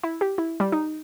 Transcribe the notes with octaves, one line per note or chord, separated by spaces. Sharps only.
E4
G4
E4
G3
D#4